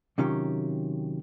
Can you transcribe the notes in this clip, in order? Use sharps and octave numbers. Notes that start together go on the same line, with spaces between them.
C3 D#3 F#3 C#4 F4 G4